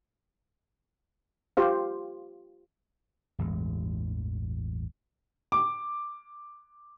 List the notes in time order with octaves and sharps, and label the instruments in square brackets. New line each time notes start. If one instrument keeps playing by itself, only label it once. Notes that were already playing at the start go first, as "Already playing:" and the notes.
[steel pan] F4 G4 C5 F5
[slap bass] A1 E2 G2 G#3
[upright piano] D6